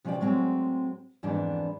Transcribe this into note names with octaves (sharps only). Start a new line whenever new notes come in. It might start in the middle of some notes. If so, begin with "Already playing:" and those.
C3 F3 C#4 D4 D5 G5
A2 F#3 G#3 C4
F2 G#2 E3 B3 D4